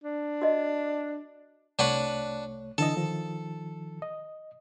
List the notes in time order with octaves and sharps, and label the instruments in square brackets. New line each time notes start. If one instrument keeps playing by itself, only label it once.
[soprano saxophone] D4
[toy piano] F#4 D#5
[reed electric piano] C2 A3 C#5 [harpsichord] D4 B4 F#5
[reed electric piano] D3 E3 D#5 [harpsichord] A4
[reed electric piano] D#3 F3
D#5